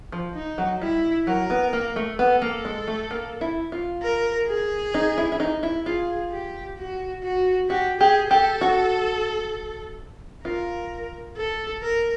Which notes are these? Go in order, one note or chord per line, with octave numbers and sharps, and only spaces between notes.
F3
D#4
F#3
G3 E4
F#3 A#4
B3
A#3
A3
B3 A4
A#3
G#3
A3
A#3
E4
F4
A#4
G#4
D#4
E4
E4
D#4
E4
F4 G#4
G4
F#4
F#4
F#4 G4
G4 G#4
G4 A4
F#4
F4 A#4
A4
A#4